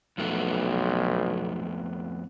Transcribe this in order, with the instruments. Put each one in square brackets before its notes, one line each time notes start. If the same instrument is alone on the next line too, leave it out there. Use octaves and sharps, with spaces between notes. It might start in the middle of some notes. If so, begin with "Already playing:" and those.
[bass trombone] B1 [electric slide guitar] F2 A3 B3